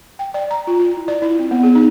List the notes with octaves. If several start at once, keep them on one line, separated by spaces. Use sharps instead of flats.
G5
D5
A#5
F4
F4
E4
D5
E4
C4
B3
G#4
D#4